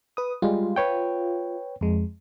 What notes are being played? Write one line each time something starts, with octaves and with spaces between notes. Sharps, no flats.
B4 D#6
G3 G#3 F4
B4 C#5 G5
F2 G#3